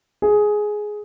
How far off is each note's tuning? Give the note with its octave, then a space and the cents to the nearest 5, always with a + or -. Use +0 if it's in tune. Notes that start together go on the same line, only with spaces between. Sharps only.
G#4 +10